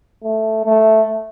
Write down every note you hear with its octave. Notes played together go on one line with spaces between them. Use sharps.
A3
A3